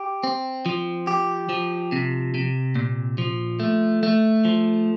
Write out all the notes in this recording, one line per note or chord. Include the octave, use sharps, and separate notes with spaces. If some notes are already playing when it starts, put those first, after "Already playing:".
Already playing: G4
C4
F3
G4
F3
C3
C3
A#2
F3
A3
A3
F3